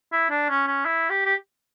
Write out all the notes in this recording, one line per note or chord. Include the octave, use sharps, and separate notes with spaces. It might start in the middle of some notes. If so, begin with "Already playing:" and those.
E4
D4
C#4
C#4
E4
G4
G4